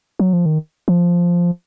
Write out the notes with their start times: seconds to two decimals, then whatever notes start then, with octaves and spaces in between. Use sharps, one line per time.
0.19 F#3
0.33 F3
0.46 D#3
0.88 F3